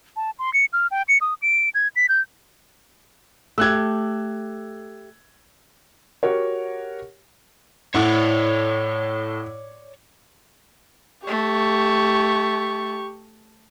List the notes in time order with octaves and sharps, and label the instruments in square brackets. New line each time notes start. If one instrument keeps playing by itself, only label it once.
[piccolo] A5
C6
C#7
F6
G5
C#7
D#6
D7
G#6
B6
G6
[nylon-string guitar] A3 G4 [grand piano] E6 F#6 G#6
[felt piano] F#4 G4 A#4 C#5
[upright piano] A2 [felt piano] E4 F#5 [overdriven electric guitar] C#5 D5
[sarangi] A3 [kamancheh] G4 C#6